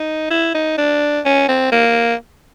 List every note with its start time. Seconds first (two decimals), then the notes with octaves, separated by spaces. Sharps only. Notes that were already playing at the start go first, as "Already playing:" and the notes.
Already playing: D#4
0.31 E4
0.54 D#4
0.78 D4
1.25 C#4
1.49 C4
1.72 A#3